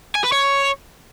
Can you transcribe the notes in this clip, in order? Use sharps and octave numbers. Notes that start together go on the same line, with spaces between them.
G#5
B4
C#5